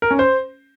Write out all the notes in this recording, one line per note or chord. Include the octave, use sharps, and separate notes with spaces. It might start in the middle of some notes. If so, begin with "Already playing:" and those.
A#4
C#4
C5